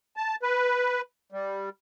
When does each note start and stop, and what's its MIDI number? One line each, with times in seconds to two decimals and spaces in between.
0.17 0.35 81
0.43 1.01 71
1.32 1.69 55